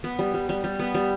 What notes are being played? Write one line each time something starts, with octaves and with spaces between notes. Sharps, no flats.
B3
G3
G3
G3
G3
B3
G3